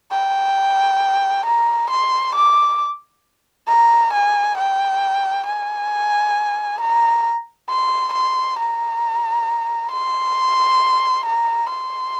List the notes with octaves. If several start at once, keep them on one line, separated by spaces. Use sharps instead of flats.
G5
A#5
C6
D6
A#5
G#5
G5
G#5
A#5
C6
C6
A#5
C6
A#5
C6